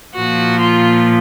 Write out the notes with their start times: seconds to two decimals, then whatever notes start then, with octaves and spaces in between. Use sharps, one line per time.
0.16 A#2 F3 F#4
0.61 F4